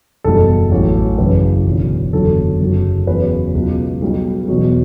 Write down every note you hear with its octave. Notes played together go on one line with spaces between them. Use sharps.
F#1 E2 B2 G3 A4
A1 A2 F#3
F#1 F#2 C#3 E3 B4
E1 E2 D3 F#3
F#1 E2 D3 F#3 A4
F#1 F#2 C#3 F#3
E2 C#3 F#3 B4
C#2 B2 F#3
B1 B2 G3
E1 E2 B2 F#3